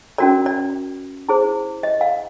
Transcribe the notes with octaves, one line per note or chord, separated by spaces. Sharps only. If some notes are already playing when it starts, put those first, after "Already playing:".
C#4 F#4 A#4 D5
D5
E4 G#4 C5
D#5
F5